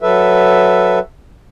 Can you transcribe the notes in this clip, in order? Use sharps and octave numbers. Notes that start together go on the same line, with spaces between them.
F#3 A4 B4 E5